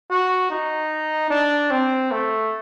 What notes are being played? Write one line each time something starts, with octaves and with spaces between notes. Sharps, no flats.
F#4
D#4
D4
C4
A3